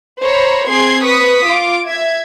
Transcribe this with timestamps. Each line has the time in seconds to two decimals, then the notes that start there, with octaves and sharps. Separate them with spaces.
0.23 C5 C#5 A#5 B5
0.69 C4 G#4 C6 G#6 C7
1.03 B4 C#6 D#6 B6
1.46 F4 D6
1.86 E5 G#6